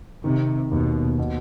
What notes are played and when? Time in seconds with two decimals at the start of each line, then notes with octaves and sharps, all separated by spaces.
0.24 C3 D#3
0.71 D#2 B2
1.18 B2